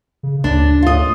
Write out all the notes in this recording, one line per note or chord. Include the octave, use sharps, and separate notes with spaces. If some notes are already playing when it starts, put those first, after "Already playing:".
C#3
D2 D4
F4 D#5